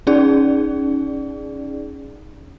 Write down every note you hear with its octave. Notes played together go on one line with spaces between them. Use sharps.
C#4 D#4 G#4 D5